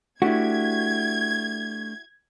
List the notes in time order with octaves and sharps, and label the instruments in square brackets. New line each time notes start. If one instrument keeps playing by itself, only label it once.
[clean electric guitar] A3 D4 G4 [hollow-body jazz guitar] E4 F#4 [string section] G#6